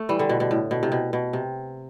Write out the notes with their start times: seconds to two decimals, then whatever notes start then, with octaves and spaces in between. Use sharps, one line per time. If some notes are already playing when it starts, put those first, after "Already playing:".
Already playing: A3
0.09 E3 G3
0.19 D3
0.29 B2
0.40 B2
0.51 A2
0.71 B2
0.83 C3
0.92 B2
1.13 B2
1.33 C3